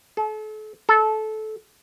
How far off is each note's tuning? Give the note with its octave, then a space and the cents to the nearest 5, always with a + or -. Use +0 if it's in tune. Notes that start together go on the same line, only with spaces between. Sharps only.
A4 -40
A4 -20